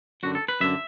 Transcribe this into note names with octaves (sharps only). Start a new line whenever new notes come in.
F#2 D3 F#4
A4
B4
F#2 D3 E5